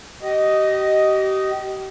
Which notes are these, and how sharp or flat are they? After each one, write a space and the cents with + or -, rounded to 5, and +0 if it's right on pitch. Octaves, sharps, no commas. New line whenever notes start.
G4 -35 D#5 +0